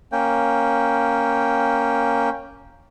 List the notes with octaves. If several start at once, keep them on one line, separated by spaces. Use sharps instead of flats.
A#3 C#4 G5